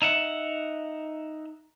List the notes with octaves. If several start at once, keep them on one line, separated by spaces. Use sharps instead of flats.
D#4 E5 F#5